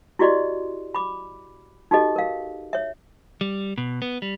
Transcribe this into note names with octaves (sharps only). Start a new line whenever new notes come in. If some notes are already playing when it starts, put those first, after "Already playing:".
E4 F#4 G4 D5 D#5 C6
B5 D6
D#4 F#4 G4 A4 D#5
A#4 F5
C#5 E5
G3
B2
B3
G3